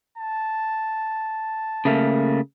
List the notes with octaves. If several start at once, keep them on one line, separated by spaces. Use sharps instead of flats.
A5
C#3 A3 A#3